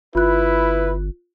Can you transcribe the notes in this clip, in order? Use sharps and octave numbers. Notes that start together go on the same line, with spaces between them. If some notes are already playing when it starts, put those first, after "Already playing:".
G1 E4 F4 B4 F#6